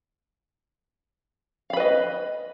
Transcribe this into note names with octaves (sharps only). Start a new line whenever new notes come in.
B4 D#5 F5 B5